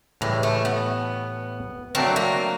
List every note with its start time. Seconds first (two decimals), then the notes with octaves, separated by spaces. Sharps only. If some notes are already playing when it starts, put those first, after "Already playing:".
0.21 A2 E3 G3 G#3
0.43 A3
0.65 B3
1.95 F#3 A3 C4 D4 F#4 A#4
2.16 A#3